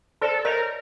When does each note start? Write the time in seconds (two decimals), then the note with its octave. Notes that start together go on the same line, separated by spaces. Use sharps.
0.21 A4 C5 D5
0.45 A#4 C#5 D#5